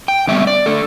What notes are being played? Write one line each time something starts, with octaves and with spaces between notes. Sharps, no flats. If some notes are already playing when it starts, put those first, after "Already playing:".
G5
D3 G3 B3 E5
D5
D3 A3 A4